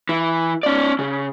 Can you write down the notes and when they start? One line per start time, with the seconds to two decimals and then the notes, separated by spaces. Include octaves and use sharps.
0.09 E3
0.63 C#4 D5
0.99 C#3